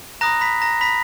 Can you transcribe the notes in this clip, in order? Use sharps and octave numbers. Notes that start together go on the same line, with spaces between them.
A#5 B5 D#6 F#6 A#6
B5 B6
A#5 A#6
B5 B6